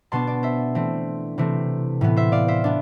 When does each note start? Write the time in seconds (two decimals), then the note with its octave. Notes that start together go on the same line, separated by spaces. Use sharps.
0.12 B2 B3 D4 A5 C6
0.27 D5
0.43 C5 E5
0.75 E3 A3 C4
1.38 C3 E3 A3 C4
2.01 A2 E3 B3
2.16 C5 E5
2.32 D5 F5
2.48 C5 E5
2.64 B3 D4